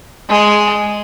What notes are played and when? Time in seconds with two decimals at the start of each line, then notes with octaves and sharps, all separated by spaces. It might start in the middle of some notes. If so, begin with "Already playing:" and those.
0.29 G#3